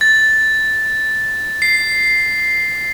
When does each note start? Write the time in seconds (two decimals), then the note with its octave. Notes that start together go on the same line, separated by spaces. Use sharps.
0.01 A6
1.62 C7